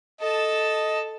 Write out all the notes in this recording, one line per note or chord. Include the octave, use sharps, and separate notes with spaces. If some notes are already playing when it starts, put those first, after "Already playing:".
A4 D#5 A5